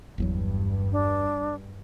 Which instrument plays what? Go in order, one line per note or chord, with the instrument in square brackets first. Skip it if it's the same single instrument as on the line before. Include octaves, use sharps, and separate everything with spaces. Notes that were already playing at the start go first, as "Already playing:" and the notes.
[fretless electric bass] G1 E2 F#3 [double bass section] G2
[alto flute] D4